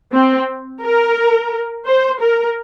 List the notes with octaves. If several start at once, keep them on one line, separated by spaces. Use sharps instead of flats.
C4
A#4
C5
A#4